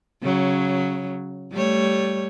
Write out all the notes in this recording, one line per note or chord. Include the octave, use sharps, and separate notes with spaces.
C#3 F#3
G3 A3 C#5